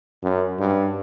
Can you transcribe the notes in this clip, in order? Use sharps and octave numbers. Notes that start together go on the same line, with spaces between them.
F#2
G2